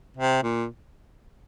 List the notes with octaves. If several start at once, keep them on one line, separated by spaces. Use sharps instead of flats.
C3
A#2